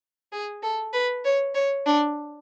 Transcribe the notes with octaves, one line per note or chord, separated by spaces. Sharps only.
G#4
A4
B4
C#5
C#5
D4